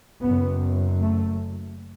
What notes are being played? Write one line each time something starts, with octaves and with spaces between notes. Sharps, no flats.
F#1 F#2 B3
A3